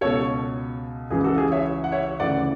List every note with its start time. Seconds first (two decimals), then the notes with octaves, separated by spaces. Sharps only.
0.01 C#2 B2 A4 C#5
1.10 C#2 C#3 E3 G#4
1.24 F#4 A4
1.38 G#4
1.52 C#5 E5
1.84 F#5
1.92 C#5 E5
2.20 D2 C#3 E3 D5 F#5